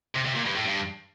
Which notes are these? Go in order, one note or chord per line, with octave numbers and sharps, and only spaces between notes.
C3
C3
A#2
G2
A2
G2